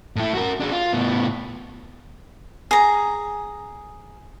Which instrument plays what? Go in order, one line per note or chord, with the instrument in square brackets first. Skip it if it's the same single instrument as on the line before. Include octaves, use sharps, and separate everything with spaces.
[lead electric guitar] A2 E4
F#4 A#4
D4 G#4
F4
A2 B3
[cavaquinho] G#4 A#5